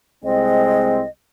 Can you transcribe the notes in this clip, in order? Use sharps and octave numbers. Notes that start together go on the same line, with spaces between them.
C2 G#3 C4 D#5